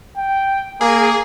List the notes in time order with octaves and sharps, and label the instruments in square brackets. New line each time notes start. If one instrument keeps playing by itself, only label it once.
[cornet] G5
[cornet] A#3 [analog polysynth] G#4